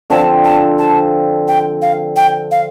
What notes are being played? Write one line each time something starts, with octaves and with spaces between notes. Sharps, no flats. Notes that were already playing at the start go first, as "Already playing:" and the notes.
D3 F3 C4 A5
A5
A5
G5
F5
G5
F5